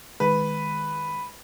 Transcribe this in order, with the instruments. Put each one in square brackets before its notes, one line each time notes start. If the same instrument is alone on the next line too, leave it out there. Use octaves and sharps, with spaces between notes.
[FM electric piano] D#3 G#3 [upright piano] B4